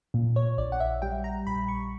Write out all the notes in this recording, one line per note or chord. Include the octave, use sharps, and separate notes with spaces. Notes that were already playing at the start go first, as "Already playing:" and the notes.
A#2
C#5
A#1 D5
F#5
E5
G3 G5
A#5
A#1 B5
C#6